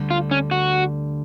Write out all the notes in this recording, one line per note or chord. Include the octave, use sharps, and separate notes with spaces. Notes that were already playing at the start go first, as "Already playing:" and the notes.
Already playing: D2 D3 G3
F4
C#4
F#4